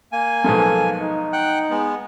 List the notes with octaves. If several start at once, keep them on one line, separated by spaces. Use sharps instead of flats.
A#3 G#5
B1 G#2 F3 A4
D#4
F#5 G5 F#6
G#3 B3